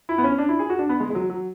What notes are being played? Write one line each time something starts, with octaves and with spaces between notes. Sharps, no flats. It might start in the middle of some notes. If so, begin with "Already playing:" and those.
E4
B3
C#4
D4
E4
G#4
F#4
D4
B3
G#3
G#3
F#3
F#3